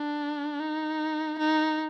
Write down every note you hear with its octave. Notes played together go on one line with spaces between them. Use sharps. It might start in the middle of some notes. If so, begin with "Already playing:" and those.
Already playing: D4
D#4
D#4